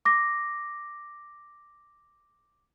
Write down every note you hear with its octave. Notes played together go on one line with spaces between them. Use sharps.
D6 A#6